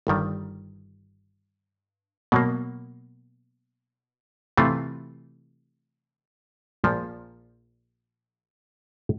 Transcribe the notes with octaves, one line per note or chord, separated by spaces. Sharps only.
G1 G2 D#3 G3
B2 F#3 A#3
C3 E3 A3 C4 F4
A#1 A#2 F3